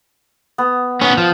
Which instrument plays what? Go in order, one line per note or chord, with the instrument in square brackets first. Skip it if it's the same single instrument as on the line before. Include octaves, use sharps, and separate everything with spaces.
[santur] B3
[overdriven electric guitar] B3 C#4 [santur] D#6
[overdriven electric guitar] F3